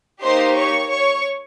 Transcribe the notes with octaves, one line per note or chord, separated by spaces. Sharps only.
A#3 D#4 G4 C5 C6
C#5 C#6
C#5 C#6